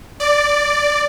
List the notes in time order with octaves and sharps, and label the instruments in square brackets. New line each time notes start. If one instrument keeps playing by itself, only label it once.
[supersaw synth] D5